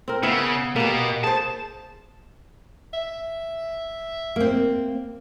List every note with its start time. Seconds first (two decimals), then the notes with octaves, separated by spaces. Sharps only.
0.08 C4 A#4
0.23 C#3 B3 E5
0.76 B2 A#3 G4
1.24 G#4 C5 A5
2.93 E5
4.36 A#3 C4